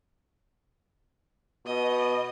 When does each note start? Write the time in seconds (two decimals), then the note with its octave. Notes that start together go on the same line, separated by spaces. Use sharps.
1.66 B2 D#5